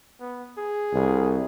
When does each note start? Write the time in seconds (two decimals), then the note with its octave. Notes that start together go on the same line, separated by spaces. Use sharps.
0.20 B3
0.58 G#4
0.94 C2